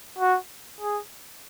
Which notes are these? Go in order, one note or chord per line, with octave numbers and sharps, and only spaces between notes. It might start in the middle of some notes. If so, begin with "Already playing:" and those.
F#4
G#4